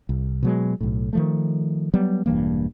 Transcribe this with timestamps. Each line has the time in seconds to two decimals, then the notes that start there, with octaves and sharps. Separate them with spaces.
0.09 C2
0.43 B2 F#3 G#3
0.80 B1 A2
1.13 D#3 F3 A3
1.94 F#3 G3 B3
2.26 E1 G2 E3 A#3